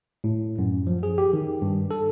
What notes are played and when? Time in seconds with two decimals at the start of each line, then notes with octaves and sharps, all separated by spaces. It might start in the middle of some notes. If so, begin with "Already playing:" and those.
0.24 A2
0.58 F#2
0.87 F3
1.03 G#4
1.18 G4
1.33 D#3
1.62 G2
1.91 A4